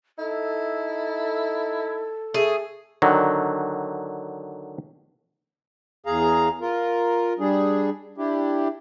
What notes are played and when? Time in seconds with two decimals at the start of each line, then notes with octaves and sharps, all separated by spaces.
0.19 D#4 E4 A4
2.34 A3 G#4
3.02 D3 D#3 F#3
6.06 E2 G#4 F5 A#5
6.61 F4 A#4
7.39 G3 D4 G#4
8.17 D4 E4 G4